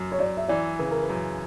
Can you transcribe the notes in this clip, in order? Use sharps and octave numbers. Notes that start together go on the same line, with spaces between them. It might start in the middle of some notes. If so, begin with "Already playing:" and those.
Already playing: F#2
C#5
F#2 D5
E5
E3 D5
C#3 B4
A#4
B4
F#2